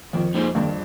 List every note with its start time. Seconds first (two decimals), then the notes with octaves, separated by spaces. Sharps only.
0.13 F2 D#3
0.34 A#3 D#4 G#4 C5
0.55 G2 D#3